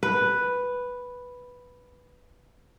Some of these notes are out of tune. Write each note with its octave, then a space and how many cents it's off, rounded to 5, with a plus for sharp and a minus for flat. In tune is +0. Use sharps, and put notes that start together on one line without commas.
B4 +0